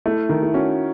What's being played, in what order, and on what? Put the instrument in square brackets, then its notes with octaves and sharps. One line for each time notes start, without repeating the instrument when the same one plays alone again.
[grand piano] A3 [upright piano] E4
[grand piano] D#3
[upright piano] E4
[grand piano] C#4 [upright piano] F#4